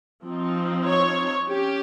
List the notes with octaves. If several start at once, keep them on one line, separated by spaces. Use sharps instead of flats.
F3 C4 D#4
C#5
C#4 G4